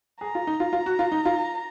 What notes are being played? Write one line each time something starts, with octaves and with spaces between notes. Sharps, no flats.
G#4 A#5
F4
D#4
F4
F4
F#4
F4
D#4
F4